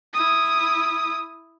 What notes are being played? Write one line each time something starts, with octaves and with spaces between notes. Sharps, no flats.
E4 D#6